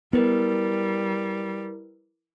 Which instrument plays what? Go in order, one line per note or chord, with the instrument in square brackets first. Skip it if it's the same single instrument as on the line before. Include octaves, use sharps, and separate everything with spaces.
[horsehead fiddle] G3 [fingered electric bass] B3 [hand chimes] E4 A#4 B4